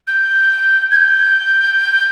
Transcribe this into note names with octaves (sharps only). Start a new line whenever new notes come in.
G6
G#6
G6